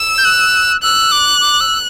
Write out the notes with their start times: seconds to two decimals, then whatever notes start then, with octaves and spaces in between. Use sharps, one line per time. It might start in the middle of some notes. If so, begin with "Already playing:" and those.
Already playing: E6
0.18 G6
0.25 F#6
0.83 E6 F#6
1.12 D6
1.41 D6
1.61 E6